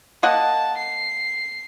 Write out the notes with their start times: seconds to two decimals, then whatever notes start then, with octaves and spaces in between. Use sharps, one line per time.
0.23 A#3 D#5 F#5 A5
0.78 C7